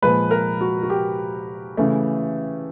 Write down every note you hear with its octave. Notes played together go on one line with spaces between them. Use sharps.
A#2 F3 G#3 B4
A#4
F#4
F#4
G4
C#3 E3 A3